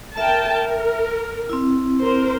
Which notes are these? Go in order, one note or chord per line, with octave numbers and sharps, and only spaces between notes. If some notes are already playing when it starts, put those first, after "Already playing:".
A#4 E5 G5 A5
A#4
C4 E4
A#4 C5